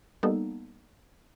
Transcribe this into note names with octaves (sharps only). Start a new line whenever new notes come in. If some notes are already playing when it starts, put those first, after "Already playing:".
G3 A#3 B3 D#4 A4